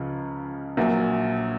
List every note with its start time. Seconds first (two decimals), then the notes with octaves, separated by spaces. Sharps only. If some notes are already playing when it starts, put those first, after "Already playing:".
Already playing: C#2 C#3 F3
0.77 A#1 A#2 F#3